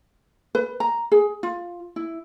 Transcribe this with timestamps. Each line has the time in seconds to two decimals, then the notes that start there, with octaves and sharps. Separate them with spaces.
0.55 B4
0.80 A#5
1.12 G#4
1.43 F4
1.96 E4